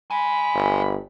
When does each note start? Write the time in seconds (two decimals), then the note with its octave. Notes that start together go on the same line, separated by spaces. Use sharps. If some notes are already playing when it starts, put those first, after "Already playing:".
0.11 D#5 G#5 B5
0.54 G1